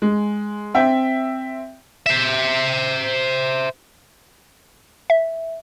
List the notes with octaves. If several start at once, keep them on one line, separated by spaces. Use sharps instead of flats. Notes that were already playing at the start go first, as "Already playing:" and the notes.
G#3
C4 E5 G5
C5 E5
E5